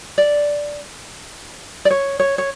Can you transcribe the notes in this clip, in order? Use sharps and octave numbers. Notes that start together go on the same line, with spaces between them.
D5
D5
C#5
C#5
C#5